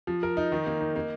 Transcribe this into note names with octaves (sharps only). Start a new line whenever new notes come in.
F3
A#4
D#4
D#3
A#3
D#4
A#3